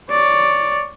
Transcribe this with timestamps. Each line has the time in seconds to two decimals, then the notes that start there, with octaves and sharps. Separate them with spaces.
0.10 C#5 D5